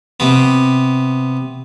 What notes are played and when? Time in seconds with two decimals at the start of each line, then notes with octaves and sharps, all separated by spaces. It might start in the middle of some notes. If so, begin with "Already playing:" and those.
0.20 C3 B3